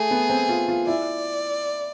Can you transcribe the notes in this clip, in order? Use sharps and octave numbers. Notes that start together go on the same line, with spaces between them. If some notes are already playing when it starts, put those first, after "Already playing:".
Already playing: A3 G#4
B3
C4
F4
F4
E4 D5